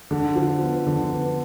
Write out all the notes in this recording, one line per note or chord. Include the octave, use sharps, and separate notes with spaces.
D3
F3
B3
D3
B3